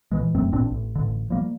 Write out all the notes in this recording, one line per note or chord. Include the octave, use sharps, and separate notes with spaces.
A#2 E3 G#3
F1 F#2 A3 C4
A1 A#2 C4 D4
A1
A1 D3
F3 G3 A#3